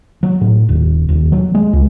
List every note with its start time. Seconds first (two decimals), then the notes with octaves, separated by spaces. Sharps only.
0.23 F#3
0.41 A2
0.69 D#1
1.09 D#1
1.32 F#3
1.55 G#3
1.73 C#2